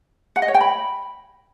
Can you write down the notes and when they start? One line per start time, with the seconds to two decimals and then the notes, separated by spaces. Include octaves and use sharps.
0.36 F#5
0.42 D#5
0.48 C#5
0.54 G5
0.61 B5